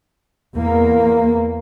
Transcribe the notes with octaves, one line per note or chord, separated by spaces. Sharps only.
E2 A#3